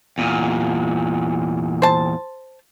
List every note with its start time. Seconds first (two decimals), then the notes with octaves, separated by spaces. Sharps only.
0.18 E2 A#2
1.82 C5 A5